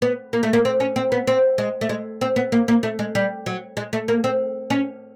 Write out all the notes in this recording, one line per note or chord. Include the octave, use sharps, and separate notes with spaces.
B3
A#3
A3
A#3
C4
C#4
C4
B3
C4
G#3
A3
G#3
C4
B3
A#3
A#3
A3
G#3
G3
F#3
G#3
A3
A#3
C4
C#4